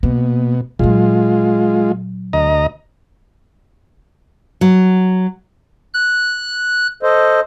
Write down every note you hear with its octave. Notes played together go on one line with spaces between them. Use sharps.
B2 A#3
A#2 F#3 G#3 F4
D2 D#5 A#5
F#3
F#6
A4 C5 D#5